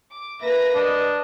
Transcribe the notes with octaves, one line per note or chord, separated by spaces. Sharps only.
D6
A#3 B4 E5 A#6
D4 D#5